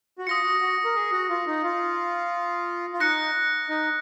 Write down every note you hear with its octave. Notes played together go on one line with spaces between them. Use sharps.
F#4
F4 D#6 A#6 C#7
F#4
F#4
A#4
G#4
F#4
F4
D#4
F4
F4
D#4 F#6 A#6 C#7
D#4